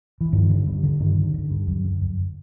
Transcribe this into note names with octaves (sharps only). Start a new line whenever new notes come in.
E3
G2 D#3
D3
G2
D3
G2 D#3
D3
D3
G2
F#2
D3
F#2